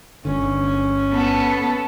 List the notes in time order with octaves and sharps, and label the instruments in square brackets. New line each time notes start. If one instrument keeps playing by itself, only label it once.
[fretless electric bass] G1 D3 [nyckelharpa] C#4
[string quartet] B3 A4